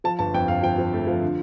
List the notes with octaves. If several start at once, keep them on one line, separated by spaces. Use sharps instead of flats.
F3 A5
G1 A5
F2 G5
G1 F5
F3 G5
F3
A3
F3
D3